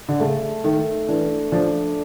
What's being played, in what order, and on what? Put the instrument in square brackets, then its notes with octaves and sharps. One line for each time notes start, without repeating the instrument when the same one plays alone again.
[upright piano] D3
[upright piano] C#3 [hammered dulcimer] A3
[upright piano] D#3 [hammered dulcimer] A3
[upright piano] E3 [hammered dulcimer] D4
[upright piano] F3 [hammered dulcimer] D4